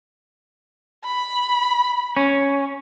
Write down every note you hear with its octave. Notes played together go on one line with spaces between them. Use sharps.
B5
C#4